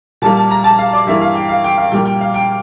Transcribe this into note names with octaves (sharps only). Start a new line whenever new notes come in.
A#2 G3 A#3 A5
A5
A#5
A5
F5
D5
G2 E3 A#3 E5
F5
G5
F5
G5
F5
A#2 G3 A#3 G5
G5
F5
G5